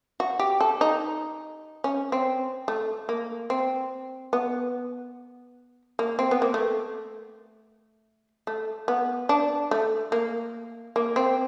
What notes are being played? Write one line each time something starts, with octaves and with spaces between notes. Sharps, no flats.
F#4
G4
A4
D#4
C#4
C4
A3
A#3
C4
B3
A#3
C4
B3
A#3
A3
A3
B3
D4
A3
A#3
A#3
C4